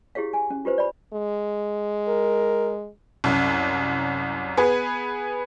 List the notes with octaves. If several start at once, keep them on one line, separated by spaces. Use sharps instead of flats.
E4 G4 G#4 C#5 F5
G#5
C#4
F4 G4 B4 C5
D5 B5
G#3
A#4
C2 F#2
B3 G#4 B4